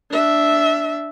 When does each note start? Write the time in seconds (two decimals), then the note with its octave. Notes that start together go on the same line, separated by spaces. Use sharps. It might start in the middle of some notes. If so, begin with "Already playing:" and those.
0.11 D4 E5